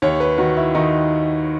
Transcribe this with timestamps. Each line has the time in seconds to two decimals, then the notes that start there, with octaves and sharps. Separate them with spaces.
0.02 D#2 C#5
0.20 B4
0.38 D#3 F#4
0.57 E4
0.75 D#3 D#4